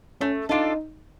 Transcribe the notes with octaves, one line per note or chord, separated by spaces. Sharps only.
A3 C#4
D4 D#4 F4 A4